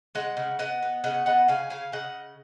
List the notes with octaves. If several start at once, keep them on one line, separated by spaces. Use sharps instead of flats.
G#3 D#5 F#5
C#3
B3 D#5 F#5
B3
C#3 D#5 F#5
B3 D#5 F#5
C#3 F5 G#5
C#3 F5 G#5
C#3 D#5 F#5